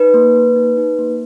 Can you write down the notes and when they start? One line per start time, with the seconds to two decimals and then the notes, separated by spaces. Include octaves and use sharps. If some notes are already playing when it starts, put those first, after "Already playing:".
Already playing: D#4 B4
0.14 A#3
0.35 A#3
0.56 D#4
0.78 D#4
0.99 A#3